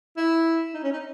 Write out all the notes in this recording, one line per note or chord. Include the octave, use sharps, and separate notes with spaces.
E4
D#4
C#4
D#4